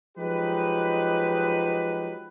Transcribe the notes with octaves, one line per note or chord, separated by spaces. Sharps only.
F3 F#3 G#3 D#4 G4 B4